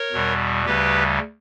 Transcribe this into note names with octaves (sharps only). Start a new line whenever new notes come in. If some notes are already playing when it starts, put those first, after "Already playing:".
Already playing: A#4 C#5
E2 B2 G3
D2 C#3 G3 G4 B4